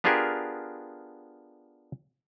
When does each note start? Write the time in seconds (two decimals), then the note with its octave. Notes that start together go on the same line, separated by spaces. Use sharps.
0.04 B3 D4 F4 G4 G#4 A#4